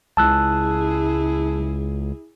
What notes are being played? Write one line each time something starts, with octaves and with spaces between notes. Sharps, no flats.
C#2 E4 G#4 A5 E6 F#6